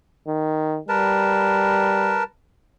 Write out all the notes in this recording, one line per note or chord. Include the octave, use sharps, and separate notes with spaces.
D#3
G3 A#4 B4 A5